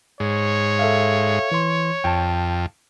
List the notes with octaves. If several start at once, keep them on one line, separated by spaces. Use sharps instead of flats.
G#2 C#5
A4 E5 F5
E3 C6
F2 G5 A5